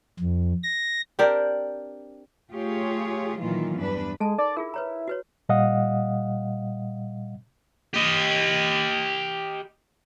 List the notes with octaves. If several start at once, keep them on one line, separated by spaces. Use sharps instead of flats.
F2
A#6
C4 D4 G4 A#4
A3 F4 G4 G#4 C#5
A#2 D#3 E3 F#3 A#3 F4
E2 G2 D4 B4
G#3 A4 A5
D#4 A#4 D5
E4 F4 G#4 A#4
B4 C#5 A#5
F#4 B4 C#5
A#2 G3 D#5 F5 F#5 D#6
G4 D#5